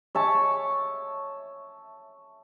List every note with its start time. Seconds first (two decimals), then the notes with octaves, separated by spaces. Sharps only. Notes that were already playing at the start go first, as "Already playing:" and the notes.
0.15 C#5 E5 A5